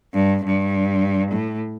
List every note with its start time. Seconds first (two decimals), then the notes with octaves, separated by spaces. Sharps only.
0.14 G2
0.44 G2
1.31 A2